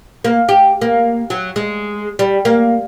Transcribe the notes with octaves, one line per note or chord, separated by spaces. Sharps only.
A#3
G4
A#3
F#3
G#3
G3
A#3